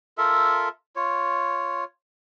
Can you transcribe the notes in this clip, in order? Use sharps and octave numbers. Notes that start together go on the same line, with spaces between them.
F4 A4 A#4 E5
F4 C#5